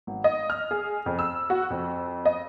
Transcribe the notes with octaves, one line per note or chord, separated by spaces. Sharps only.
G#1
D#5
F6
G#4
F2
E6
F#4
F2
D#5